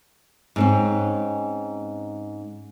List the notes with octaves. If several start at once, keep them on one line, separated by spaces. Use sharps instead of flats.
G#2 C4 C#4